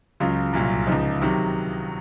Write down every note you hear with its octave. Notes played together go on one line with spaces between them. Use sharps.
C#2 C#3 F#3 F4
C2 A#2 F#3
C#2 C#3 F3 D#4
C3 D#3 F#3